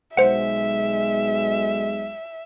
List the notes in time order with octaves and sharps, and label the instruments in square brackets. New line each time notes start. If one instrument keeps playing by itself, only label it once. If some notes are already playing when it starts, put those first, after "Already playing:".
[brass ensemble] B1 G#3 [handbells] C5 F#5 [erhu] E5